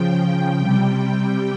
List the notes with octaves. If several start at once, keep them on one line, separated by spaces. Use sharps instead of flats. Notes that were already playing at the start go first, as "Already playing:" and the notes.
Already playing: C#3 F3 G5
C3 G3